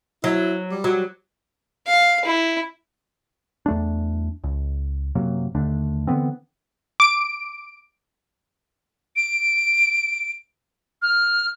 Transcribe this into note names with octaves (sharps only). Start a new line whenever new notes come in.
F#3 E4
G3
F#3
F5
E4
E2 A3 D4
C#2
F#2 C3 F#3 A#3
D#2 D3 A3 D4
D3 E3 B3 C4
D6 D7
D7
F6